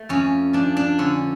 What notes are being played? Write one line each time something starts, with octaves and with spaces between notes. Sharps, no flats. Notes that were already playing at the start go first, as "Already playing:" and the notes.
Already playing: A3
F2 C#4
F3 D4
D4
D3 C#4